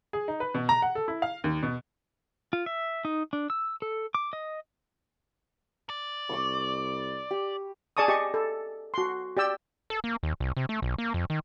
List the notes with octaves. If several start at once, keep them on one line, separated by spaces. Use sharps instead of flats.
G#4
D#4
B4
B2
A#5
F#5
A4
E4
F5
D#2
B2
F4
E5
D#4
D4
E6
A4
D6
D#5
D5
C2 B5 C#6 D6
G4
G#4 D5 A5 C#6 D#6
G4 D#5 C#6
A4
F#4 C6
G4 D5 G5 E6
A4
A#3
D#2
C2
C3
A3
B1
A#3
F2
D#3